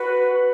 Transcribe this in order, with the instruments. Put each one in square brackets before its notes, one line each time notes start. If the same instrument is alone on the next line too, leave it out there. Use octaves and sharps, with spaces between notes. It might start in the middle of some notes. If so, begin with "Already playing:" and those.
Already playing: [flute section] F#4 B4